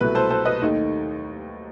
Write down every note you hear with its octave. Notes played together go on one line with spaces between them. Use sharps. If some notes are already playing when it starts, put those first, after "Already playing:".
C2 B2 F#3 A3 E4 B4
A4 C5
A4 C5
B4 D#5
D#2 D#3 A3 D#4